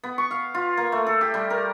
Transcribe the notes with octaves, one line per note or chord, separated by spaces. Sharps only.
B3
C#6
F5
F4
A#3
A3
A4
G4
G3
A#4